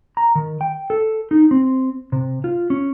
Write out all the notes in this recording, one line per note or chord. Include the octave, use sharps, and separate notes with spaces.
A#5
D#3
G5
A4
D#4
C4
C3
F4
C#4